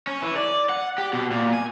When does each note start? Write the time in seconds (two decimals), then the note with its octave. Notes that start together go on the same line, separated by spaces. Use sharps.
0.07 C#4
0.22 E3
0.36 D5
0.69 F#5
0.98 G4
1.13 B2
1.31 A#2
1.53 G#5